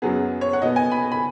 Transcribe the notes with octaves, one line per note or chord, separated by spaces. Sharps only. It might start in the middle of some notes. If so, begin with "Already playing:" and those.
F#2 F#3 B3 G#4
C#5
F#5
B2 B3 D#5
G#5
B5
B5